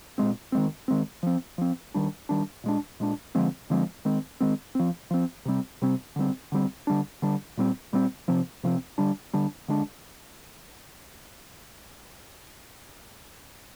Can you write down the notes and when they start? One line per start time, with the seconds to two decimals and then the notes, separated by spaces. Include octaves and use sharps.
0.18 A#2 G#3 C4
0.52 D#3 G#3 C4
0.88 D#3 G#3 C4
1.23 F3 C4
1.58 F3 C4
1.94 D#3 G3 D4
2.29 D#3 G3 D4
2.64 A#2 G#3 D4
3.00 A#2 G#3 D4
3.35 D3 F3 G#3 C4
3.70 D3 F3 G#3 C4
4.05 D#3 G#3 C4
4.41 D#3 G#3 C4
4.75 F3 C4
5.11 F3 C4
5.45 C3 G3 C4
5.82 C3 G3 C4
6.16 D3 G3 C4
6.52 D3 G3 C4
6.87 D3 G3 D4
7.22 D3 G3 D4
7.57 A#2 G3 C4
7.93 A#2 G3 C4
8.28 C3 F3 C4
8.63 C3 F3 C4
8.98 D3 G3 D4
9.34 D3 G3 D4
9.68 D3 G#3 D4